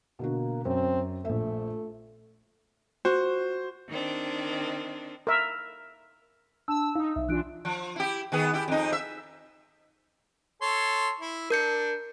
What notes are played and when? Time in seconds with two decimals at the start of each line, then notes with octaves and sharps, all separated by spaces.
0.19 B2 D3 A#3 F#4
0.65 F#2 C4
1.25 A#1 A3 E5
3.05 F#4 C5
3.90 D#3 C4 D4
5.27 A#4 E5
6.68 D4 A5 E6
6.95 D#4 F5 D#6
7.16 B1 E5
7.29 E3 D4 F4 F#6 D7
7.65 F3
7.96 E4 G4
8.32 D#3 B3 G#4
8.53 E4 G4
8.68 F2 D#4
8.92 E5
10.62 A4 C#5 C6
11.20 E4
11.50 D4 A#4 G6 C#7